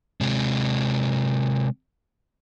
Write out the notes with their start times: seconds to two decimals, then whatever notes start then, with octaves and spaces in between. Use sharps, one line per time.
0.21 C3 G#3